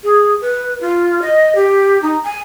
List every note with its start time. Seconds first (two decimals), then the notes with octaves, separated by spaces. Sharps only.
0.04 G#4
0.41 B4
0.81 F4
1.22 D#5
1.55 G4
2.02 D#4
2.24 G#5